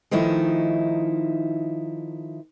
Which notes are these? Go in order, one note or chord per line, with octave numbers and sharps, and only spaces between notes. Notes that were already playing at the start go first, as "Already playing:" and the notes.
D#3 F3 A3 D#4 E4